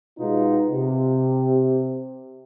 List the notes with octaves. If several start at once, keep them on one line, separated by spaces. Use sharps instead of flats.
B2 G#3 B3 D#4 F4
C3